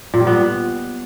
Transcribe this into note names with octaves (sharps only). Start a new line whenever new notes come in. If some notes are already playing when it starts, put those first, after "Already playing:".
A#2
G3
B3